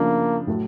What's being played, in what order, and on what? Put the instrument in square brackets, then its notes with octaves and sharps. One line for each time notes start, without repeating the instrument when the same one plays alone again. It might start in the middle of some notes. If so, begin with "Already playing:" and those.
Already playing: [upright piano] C#3 F3 A3 D4 F4 [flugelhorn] A#3
[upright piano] A2 F#3 A3